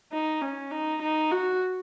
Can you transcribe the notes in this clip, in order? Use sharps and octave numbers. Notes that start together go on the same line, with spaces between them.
D#4
C#4
D#4
D#4
F#4